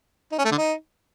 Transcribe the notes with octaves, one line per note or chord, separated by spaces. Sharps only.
D#4
C#4
A3
D3
D#4